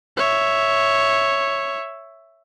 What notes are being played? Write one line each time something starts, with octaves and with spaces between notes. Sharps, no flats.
C#5 E5